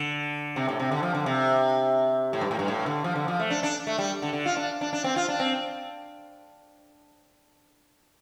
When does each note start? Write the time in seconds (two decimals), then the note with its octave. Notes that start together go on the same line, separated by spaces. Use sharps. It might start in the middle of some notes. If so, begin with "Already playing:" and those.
Already playing: D3
0.56 C3
0.68 A2
0.80 C3
0.91 D3
1.03 F3
1.15 D3
1.26 C3
2.33 A2
2.41 G2
2.51 A2
2.59 G2
2.68 A2
2.86 D3
3.04 F3
3.16 D3
3.28 F3
3.39 A3
3.50 D4
3.63 D4
3.87 A3
3.98 G3
4.22 D3
4.33 D3
4.46 F4
4.57 D4
4.81 D4
4.93 D4
5.04 C4
5.16 F4
5.29 D4
5.40 C4